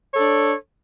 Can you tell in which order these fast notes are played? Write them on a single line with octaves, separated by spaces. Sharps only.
C#5 A4 D4